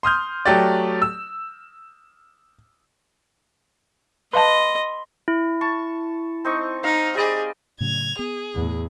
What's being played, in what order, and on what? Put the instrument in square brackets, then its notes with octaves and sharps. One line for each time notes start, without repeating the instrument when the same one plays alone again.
[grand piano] C6 D#6 F6 G6
F#3 A3 G4 D5
E6
[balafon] B4 F5 A5 [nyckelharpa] D#5 [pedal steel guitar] B5 C6 F#6
[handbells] E4
[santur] A5 C#6
C4 D#4 C#6
[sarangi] D#4 [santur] F5
[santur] G3 D5 D#5 [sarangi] G#4
[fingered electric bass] A2 C#3 F#3 [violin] G#6 F7
[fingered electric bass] B3 [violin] G#4
[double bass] E2 A2